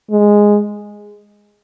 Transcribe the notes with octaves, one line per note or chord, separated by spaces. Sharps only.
G#3